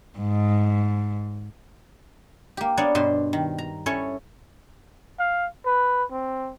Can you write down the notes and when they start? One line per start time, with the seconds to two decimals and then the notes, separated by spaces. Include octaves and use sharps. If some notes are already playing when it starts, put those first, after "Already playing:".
0.19 G#2
2.57 A#3 G4
2.77 A#3 B3 D4 C#5 D5
2.95 G2 B2 C5 C6
3.33 D#3
3.58 A#5
3.86 C#4 E4 A4 C#5
5.19 F5
5.66 B4
6.11 C4